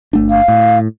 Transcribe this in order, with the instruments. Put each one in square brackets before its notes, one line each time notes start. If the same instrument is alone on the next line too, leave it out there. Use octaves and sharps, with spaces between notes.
[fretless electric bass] G1 A3 D4
[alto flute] F5
[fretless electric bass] A2